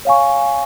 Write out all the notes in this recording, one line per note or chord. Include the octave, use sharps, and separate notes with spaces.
C#5 F5 G#5 C#6